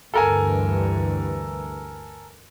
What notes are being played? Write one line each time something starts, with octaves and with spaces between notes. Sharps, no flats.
D2 G2 E3 A4 A#4 G#5